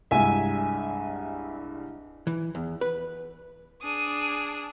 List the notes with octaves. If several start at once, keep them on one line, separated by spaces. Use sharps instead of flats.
C2 G2 G#3 E5 G#5
E3
E2
B4
D4 G#4 D#6